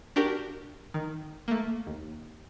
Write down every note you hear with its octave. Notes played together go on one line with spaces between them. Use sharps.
D4 F#4 G4 A#4
D#3
A3 A#3
D#2